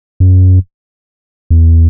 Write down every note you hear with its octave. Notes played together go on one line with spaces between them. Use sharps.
F#2
E2